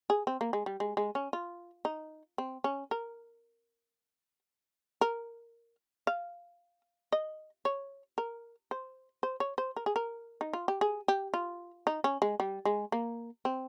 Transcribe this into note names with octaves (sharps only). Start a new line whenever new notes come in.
G#4
C4
A#3
G#3
G3
G#3
G#3
C#4
F4
D#4
C4
C#4
A#4
A#4
F5
D#5
C#5
A#4
C5
C5
C#5
C5
A#4
G#4
A#4
D#4
F4
G4
G#4
G4
F4
D#4
C#4
G#3
G3
G#3
A#3
C4